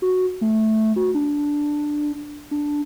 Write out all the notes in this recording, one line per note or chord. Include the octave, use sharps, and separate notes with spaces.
F#4
A3
F#4
D4
D4